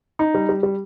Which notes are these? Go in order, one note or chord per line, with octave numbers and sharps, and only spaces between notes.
D#4
G3
G3
G3